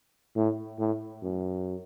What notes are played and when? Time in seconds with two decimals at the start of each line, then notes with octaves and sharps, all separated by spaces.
0.36 A2
0.79 A2
1.23 F#2